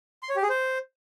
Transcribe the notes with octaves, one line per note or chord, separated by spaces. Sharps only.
C6
C#5
G4
G#4
C5